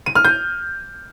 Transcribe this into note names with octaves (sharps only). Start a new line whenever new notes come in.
D#7
F6
G6